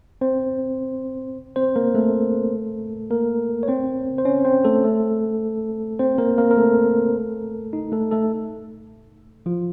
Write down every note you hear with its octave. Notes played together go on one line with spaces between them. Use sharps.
C4 C5
C4 C5
A#3 A#4
A3 A4
A#3 A#4
C#5
C4 C5
C5
C#4 C#5
C4 C5
A3 A4
A3 A4
C4 C5
A#3 A#4
A#3 A#4
A#4
A3 A4
D#4
A3 A4
A3 A4
F3 F4